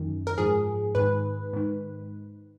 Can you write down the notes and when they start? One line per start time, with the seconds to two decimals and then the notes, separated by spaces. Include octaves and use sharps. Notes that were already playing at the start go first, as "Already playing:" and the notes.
Already playing: F#2 D#3
0.27 A#4
0.37 G#2 F3 G#4
0.95 G#2 D#3 B4
1.53 G#2 D#3